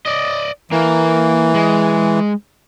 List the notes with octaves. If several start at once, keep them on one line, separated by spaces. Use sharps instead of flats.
D5 D#5
E3 A#3
G#3